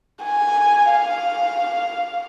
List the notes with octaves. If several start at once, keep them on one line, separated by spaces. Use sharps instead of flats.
G#5
F5